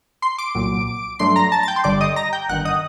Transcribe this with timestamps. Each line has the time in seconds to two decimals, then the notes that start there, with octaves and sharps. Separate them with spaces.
0.22 C6 C7
0.38 D6 D7
0.55 C2 A#2 F#3
1.19 G2 F#3 A3 D4 C6 C7
1.36 A#5 A#6
1.52 A5 A6
1.63 A6
1.68 G5 G6
1.76 C6
1.84 G1 G2 D3 G3 D5 D6
2.01 D#5 D#6
2.16 A#5 A#6
2.33 G5 G6
2.49 G1 G2 D#3 F#5 F#6
2.65 D#5 D#6